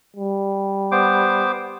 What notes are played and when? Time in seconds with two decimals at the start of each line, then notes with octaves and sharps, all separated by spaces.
0.17 G3
0.92 B3 C5 D6